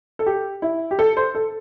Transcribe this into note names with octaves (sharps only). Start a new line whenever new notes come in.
A4
G4
E4
G4
A4
C5
A4